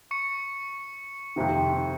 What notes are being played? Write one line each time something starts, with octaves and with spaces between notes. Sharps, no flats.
C#6 C#7
F2 C3 D#3